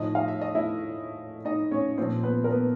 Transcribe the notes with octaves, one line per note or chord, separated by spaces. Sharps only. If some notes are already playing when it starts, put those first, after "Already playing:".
Already playing: A2 F3 D#4 D#5
F5
E5
D#5
E4 E5
D#4 D#5
C#4 C#5
A#2 F3 C4 C5
B3 B4
A#4
B3 B4